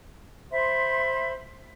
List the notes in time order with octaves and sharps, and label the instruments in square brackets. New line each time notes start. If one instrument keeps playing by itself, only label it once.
[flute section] C5 E5 B5 C6